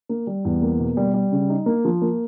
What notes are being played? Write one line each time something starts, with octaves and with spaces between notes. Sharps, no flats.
A#3
G3
E2
A#3
B2
G3
G3
C#3
D#4
A#3
F3
A#3